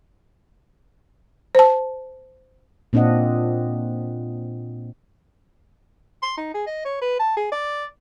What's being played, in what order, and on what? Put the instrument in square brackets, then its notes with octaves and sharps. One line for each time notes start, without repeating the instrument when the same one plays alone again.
[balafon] C5 A5
[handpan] A#2 C4 D4 F4 D#5 F#5
[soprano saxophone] C6
D#4
G#4
D#5
C#5
B4
A5
G#4
D5